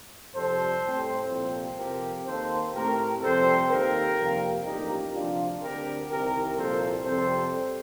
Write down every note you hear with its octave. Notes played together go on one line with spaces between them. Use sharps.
F2 C3 G3 A4 C5
A2 G3 C4
C2 A#2 F3 C4 A4 C5
F2 C3 F3 C4 G4 A#4
D#2 D#3 A#3 A4 C5
A2 A3 C4 G4 A#4
F2 C3 G3 C4 A4 C5
D#2 D#3 A#3 G4 A#4
F2 C3 G3 A#3
A1 G2 F3 A#3 D#4 G4
D2 C3 F3 D4 F4
D2 D3 G3 C4 G4 A#4
C2 C3 D#3 G4 A#4
C2 A#2 F3 A#3 A4 C5
F2 C3 G3 C4 A4 C5